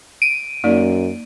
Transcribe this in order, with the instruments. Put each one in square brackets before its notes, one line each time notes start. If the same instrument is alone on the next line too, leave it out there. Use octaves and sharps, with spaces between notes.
[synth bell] D7 D#7
[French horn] F#2 [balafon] A#3 D#4 D5